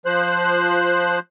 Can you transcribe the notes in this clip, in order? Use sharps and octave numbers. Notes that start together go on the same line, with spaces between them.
F3 C5 F#6